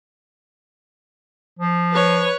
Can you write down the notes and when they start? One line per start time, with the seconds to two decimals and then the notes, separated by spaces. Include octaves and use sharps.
1.59 F3
1.91 B4 C#5